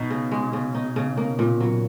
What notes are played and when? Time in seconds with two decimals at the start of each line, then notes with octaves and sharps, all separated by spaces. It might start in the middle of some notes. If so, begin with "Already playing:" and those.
Already playing: B2 D#4
0.10 C#3
0.32 G#3
0.53 C#3
0.74 D#4
0.96 C#3
1.17 A#3
1.39 A#2
1.60 F#3